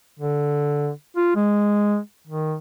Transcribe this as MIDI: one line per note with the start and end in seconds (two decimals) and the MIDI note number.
0.19 0.90 50
1.17 1.36 65
1.36 1.99 56
2.27 2.56 51